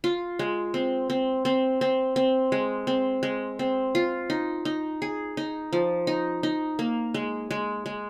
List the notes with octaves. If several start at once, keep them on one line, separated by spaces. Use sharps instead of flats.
F4
G#3
C4
C4
C4
C4
C4
G#3
C4
G#3
C4
F4
D#4
D#4
G#4
D#4
F3
D#4
D#4
A#3
G#3
G#3
G#3